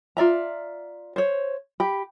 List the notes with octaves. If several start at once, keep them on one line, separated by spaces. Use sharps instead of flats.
F4 D5 E5 A#5
C5 C#5
G4 B5